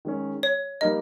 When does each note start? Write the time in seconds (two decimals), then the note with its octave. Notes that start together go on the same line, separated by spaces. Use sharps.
0.05 D#3 G#3 C#4
0.43 C#5
0.81 G3 A#3 D#4 A#4 D#5